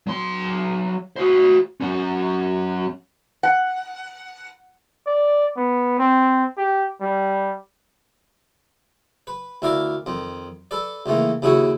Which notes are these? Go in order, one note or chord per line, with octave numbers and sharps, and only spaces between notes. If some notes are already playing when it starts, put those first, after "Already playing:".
F#3 C6
F#4 C5
F#3 C#4
F#5
D5
B3
C4
G4
G3
B4
D2 E4 A#4 D5 F5 D6
F2 D#3
A4 B4 D5
C#2 D#3 E3 A3 A#3
D#2 C#3 D#4 E4 F#4 C#5